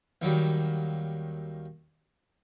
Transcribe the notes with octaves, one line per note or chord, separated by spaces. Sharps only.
D#2 D#3 F#3 G3